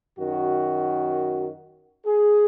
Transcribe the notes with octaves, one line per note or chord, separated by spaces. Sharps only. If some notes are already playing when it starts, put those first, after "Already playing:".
F#2 D#3 F#4
G#4